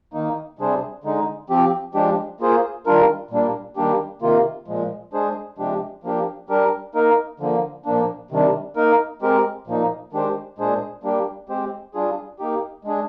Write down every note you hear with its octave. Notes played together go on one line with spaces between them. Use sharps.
D#3 A#3 D#4
C3 G3 D4 G#4 C5
D3 G#3 D#4
F3 C4 G4
F3 G#3 D4 G4
A#3 F4 G#4 C5
D#3 G3 D4 F4 A#4
A#2 G3 A#3 D4
D#3 G3 A#3 D4 G4
C3 D#3 A#3 F4
A#2 F3 G#3
G#3 D4 G#4 C5
C3 F3 G#3 D4 G4
F3 A#3 D4 G4
G3 D4 G4 A#4
A#3 D#4 A#4
D3 F3 A#3
A#2 F3 A#3 D4
C3 D#3 G3 D4
A#3 D#4 A#4
G#3 C4 G4 A#4
A#2 F3 A#3 D#4
D#3 G#3 D4 G4 C5
A#2 G#3 D4 G#4 C5
G3 A#3 D4 G4
G#3 C4 G4 C5
G3 D4 F4 G#4
A#3 D#4 G4
G#3 D4 G#4